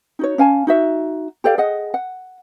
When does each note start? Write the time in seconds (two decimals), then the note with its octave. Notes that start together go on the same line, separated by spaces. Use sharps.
0.19 D#4 F#4 C#5
0.38 C#4 F5 G#5 A5
0.67 D#4 F#4 E5
1.44 G4 A4 D5 F5
1.58 G#4 D#5 F#5
1.94 F#5